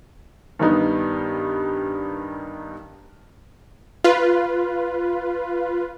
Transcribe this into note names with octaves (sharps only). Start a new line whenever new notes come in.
G2 D#3 G3 B3 D#4
F4 B4